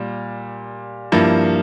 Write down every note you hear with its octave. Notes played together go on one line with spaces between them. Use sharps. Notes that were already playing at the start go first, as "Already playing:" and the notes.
Already playing: A#2 G3
G2 F3 A#3 E4